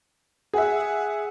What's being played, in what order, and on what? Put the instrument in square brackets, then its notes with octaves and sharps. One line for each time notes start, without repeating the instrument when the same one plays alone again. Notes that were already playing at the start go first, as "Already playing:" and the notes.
[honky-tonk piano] G#4 E5 [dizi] F#5